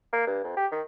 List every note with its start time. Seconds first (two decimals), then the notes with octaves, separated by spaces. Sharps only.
0.12 A#3
0.27 G2
0.44 F2
0.57 G4
0.72 D#3